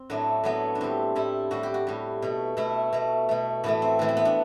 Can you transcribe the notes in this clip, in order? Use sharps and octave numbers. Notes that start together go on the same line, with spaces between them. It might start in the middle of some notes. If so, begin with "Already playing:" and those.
Already playing: C4
A2 F#3 A3 D4
A2 F#3 A3 B3
D4
A2 G3 C4
A2 G3 E4
A2 G3 F#4
G4
F#4
A2 G3
B2 A3
B2 A3 E4
B2 A3
B2 A3
A2 E3 A3 B3
C4
A2 E3 A3
C4
B3
D4